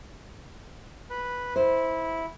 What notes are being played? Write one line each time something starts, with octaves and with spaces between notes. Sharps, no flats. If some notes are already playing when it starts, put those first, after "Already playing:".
B4
E4 C5